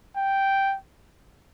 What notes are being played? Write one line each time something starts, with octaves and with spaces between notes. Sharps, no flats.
G5